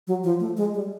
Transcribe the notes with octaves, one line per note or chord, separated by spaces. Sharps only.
F#3
F3
A3
G#3
G3